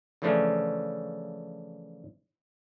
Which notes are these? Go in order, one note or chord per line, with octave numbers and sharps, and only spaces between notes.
C#3 E3 F3 A3 C#4 D4